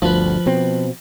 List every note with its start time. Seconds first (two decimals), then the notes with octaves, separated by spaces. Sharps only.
0.02 G1 D2 F3 B4
0.46 B2 C4